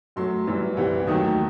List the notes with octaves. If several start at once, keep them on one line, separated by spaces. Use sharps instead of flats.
F#2 F#3 A3 C6
F#2 E3 G3
C2 C3 E3 G3
D#2 D#3 F#3 A3 D#6